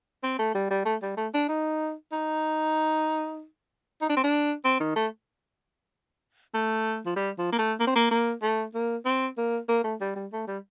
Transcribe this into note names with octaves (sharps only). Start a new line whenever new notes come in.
C4
A3
G3
G3
A3
G3
A3
D4
D#4
D#4
D#4
D4
C4
D4
C4
D#3
A3
A3
F3
G3
F3
A#3
A3
A#3
C4
A#3
A#3
A3
A#3
C4
A#3
A#3
A3
G3
G3
A3
G3